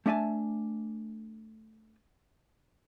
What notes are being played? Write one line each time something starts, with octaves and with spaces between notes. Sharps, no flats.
A3 D4 E5 G#5 A5